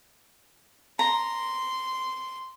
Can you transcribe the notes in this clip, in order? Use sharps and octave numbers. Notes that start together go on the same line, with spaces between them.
A#5 C6